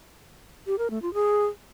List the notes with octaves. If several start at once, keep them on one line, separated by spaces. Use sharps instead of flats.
G4
A#4
A3
F4
G#4